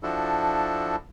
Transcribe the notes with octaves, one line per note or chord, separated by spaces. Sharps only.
F3 D4 E4 F#4 A4